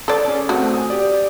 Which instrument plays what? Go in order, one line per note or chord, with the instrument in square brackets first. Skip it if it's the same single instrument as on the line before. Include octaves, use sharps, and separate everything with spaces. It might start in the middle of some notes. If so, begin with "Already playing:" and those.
[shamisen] A4 D5
[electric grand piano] C#4 G#4
[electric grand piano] A3 C4 [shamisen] F#4
[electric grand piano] G#5 D#6
G4 D5